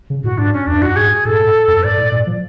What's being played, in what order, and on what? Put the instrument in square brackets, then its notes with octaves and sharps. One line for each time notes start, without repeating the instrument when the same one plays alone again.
[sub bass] C#3
[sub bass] A2 [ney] F#4
[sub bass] G#2 [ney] D4
[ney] C#4
[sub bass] F2 [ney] D4
[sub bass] F#2 [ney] F#4
[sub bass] G#2 [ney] G#4
[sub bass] A2 [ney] A4
[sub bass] G#2
F#2
[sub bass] G#2 [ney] D5
[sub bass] A2
A2
F3